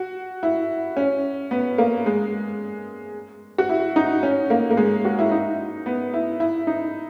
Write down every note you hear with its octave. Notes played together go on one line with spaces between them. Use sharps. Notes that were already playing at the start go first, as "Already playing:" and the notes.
Already playing: F#4
E4
C#4
B3
A#3
G#3
F#4
E4
D#4
C#4
A#3
A#3
G#3
F#4
E4
D#4
B3
E4
E4
D#4